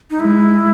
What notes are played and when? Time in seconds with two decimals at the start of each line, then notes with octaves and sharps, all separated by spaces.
0.11 D#4
0.20 G#3 E4